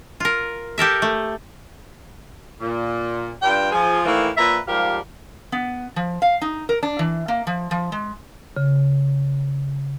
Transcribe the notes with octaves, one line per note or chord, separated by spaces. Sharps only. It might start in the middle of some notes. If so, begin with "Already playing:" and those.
F4 A#4
G4 A4 A#4 E5
A3
A#2
G2 D4 F4 G5
F3 G#4
A2 D#3 E3 A3 A#3
A#2 F3 B4 E5 A#5
G#2 F3 G3 G4 A#4 F5
B3
F3
F5
D#4
A#4
D4
E3
A#3
F3
F3
G#3
C#3